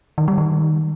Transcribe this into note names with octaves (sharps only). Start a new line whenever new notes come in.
D#3
G3
D#3